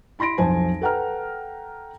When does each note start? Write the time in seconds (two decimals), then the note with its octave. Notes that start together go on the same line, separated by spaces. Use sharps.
0.19 E4 B5 C6 A#6 D7
0.38 B1 F2 C5 G#5 A5
0.82 A4 B4 F#5 G5 A#5 F6